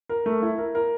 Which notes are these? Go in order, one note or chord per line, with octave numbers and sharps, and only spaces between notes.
A#4
A3
E4
A#4
A#4